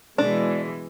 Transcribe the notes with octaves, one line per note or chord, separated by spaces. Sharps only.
B2 E3 G#3 D4